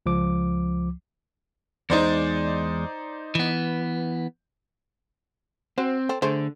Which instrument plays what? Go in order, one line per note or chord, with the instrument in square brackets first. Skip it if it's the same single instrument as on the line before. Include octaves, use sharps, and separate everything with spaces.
[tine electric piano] C#2 F3 D6
[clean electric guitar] E2 G#3 [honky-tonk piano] D#4 C5 D5
[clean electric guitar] E3 B3
[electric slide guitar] C4 [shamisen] F#4 C5
[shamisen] C4 A4
[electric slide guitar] D3 [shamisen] A3 G#4 C5